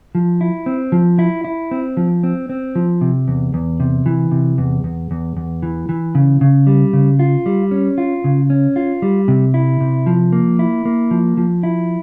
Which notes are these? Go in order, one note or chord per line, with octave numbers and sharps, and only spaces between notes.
F3
E4
C4
F3
E4
E4
C4
F3
C4
C4
F3
C3
E2
E2
C3
E3
C3
E2
E2
E2
E2
E3
E3
C#3
C#3
G3
C#3
F4
G3
C#4
F4
C#3
C#4
F4
G3
C3
E4
C3
F3
A#3
E4
A#3
F3
F3
E4